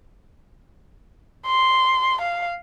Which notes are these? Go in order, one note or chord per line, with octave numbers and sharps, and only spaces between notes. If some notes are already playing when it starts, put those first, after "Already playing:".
C6
F5